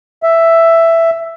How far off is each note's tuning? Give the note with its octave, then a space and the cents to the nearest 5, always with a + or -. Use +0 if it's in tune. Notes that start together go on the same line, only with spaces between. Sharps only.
E5 +5